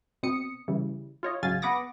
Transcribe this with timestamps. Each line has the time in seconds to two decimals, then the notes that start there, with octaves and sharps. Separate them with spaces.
0.23 B2 C4 D#6 C#7
0.68 C#3 E3 G3
1.23 F4 C#5 D#5
1.43 A1 C#3 F#3 F5 G#5 A6
1.62 B3 B4 F#5 D6 D#6 A#6